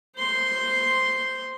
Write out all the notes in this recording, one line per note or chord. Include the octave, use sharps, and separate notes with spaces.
C5 C6